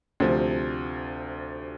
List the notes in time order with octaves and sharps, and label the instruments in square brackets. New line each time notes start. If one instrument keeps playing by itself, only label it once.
[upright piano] D2 C3 F3